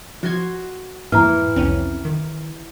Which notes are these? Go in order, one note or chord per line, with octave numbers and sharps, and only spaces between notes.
F3 F#4 C6 G#6
F2 G#2 E3 A#3 A#5 F6
C2 F2 C4 C#4
D#3